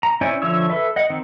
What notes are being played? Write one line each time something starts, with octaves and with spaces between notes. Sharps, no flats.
A#5
C#4 E4 C5 D5 G#5
D3 F3 C#5 E5 E6
A4 B4 E5
D#5 F#5
D#3 C4